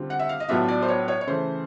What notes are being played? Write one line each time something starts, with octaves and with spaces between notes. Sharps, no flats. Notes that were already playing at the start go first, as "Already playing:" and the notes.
Already playing: D3 G3 C4 F4
F#5
E5
F5
D#5
A2 F#3 B3 D4 F4 E5
D5
C5
C#5
C#5
C#5
C#3 E3 A3 C5